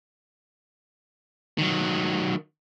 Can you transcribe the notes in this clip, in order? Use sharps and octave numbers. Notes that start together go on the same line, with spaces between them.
D#3 F#3